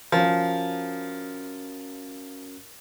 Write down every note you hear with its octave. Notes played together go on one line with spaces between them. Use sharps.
F3 C#4 F#4 A#4